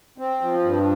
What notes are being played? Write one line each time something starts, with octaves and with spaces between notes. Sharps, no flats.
C4
F3
G2